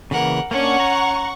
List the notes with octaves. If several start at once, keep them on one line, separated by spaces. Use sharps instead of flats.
C#3 E3 A#3 A#4 F#5
A#3 C#4 D4 F#5 C#6
A#5